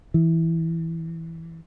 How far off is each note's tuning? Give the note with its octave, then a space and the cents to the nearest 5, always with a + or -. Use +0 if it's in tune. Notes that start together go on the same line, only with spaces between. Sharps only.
E3 -5